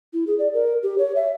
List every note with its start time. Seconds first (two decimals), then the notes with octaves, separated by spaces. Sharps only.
0.13 E4
0.27 G#4
0.39 D5
0.54 A#4
0.83 G4
0.98 C#5
1.16 E5